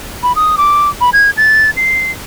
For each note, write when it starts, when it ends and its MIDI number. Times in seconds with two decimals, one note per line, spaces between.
0.23 0.35 83
0.35 0.56 87
0.57 0.89 86
1.01 1.10 83
1.13 1.30 92
1.37 1.70 93
1.77 2.11 96